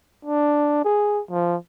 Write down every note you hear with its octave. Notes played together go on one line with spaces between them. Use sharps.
D4
G#4
F3